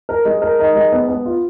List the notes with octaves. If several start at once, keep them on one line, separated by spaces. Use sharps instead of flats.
A#4
G#3
A#4
D#4
G#3
B3
B3
F4